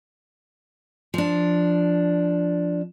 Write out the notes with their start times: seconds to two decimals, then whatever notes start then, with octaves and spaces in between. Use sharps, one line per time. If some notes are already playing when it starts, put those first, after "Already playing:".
1.14 F3 D4